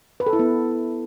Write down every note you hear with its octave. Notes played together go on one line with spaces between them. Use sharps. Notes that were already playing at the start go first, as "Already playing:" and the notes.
B4
A4
E4
B3